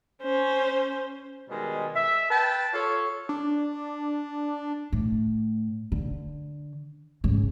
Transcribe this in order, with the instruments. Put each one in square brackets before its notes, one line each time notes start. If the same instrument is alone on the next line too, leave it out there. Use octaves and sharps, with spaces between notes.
[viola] C#4 C5
[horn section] B2 D#3 G3 G#3
E5
B4 G5 A5
F4 A4 C#5
[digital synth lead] D4
[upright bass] A2
D3
G#2 C#3